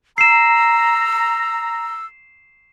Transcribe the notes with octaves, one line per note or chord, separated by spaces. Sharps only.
A#5 E6 C7 E7